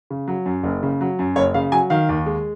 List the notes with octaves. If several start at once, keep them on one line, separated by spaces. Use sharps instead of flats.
C#3
F#3
F#2
F#1
C#3
F#3
F#2
F#1 C#5
C#3 F5
F#3 G#5
D#3 F5
D#2
G#3